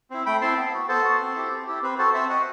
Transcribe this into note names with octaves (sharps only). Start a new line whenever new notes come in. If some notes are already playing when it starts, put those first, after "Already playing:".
C4 E4
A3 G5 B5
C4 E4 A5 C6
B3
F#4
B3 A4 C5
F#4
C4
E4 G4
C4
E4 G4
C4 B4
F#4 A4 C5
C4 C5 E5
F#4 D#5 F#5